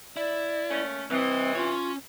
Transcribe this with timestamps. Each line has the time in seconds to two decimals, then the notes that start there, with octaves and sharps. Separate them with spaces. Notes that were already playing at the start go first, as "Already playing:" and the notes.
0.17 E4 D5
0.70 A3 A#3 C#4
1.10 C2 C3 E3 C4 D#5
1.55 C#4 F4 C#5